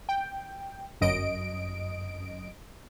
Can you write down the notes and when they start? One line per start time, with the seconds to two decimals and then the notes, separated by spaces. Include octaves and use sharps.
0.09 G5
1.01 G1 F#2 D#5 D7